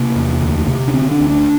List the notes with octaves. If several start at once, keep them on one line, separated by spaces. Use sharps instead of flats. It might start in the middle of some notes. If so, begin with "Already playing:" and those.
Already playing: C3 A#3
E2
D2
C3
D4
D3 C4
D4
D2
D4